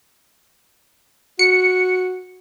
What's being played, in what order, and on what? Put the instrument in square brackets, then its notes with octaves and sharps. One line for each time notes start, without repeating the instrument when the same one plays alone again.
[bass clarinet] F#4 [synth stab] C#7